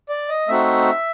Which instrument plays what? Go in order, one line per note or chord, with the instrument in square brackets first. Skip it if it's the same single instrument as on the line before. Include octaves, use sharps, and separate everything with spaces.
[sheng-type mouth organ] D5
D#5
A3 C4 D#4 F#4 E5